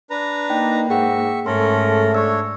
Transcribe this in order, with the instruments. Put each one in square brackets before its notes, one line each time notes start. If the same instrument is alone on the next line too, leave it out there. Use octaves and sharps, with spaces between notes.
[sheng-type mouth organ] D4 B4 A#5
[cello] A#3 [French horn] D#4 [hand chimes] G5
[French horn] G#2 [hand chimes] G#4 F#5 G5 [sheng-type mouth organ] E5 C#6
[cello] G#2 [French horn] A3 [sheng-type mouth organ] C#4 A4 A#4 [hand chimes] C6
[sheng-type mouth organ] D4 C#5 [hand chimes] C#6 E6